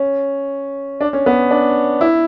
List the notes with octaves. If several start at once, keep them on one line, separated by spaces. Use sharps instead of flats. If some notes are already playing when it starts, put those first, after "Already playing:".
Already playing: C#4
D4
C#4
B3
D4
E4